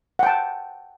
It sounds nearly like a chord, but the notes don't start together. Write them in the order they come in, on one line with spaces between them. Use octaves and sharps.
F#5 G5 A5